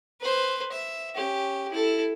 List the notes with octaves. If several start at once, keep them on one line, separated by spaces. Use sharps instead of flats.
B4 C5
E5
C#4 G4
E4 A4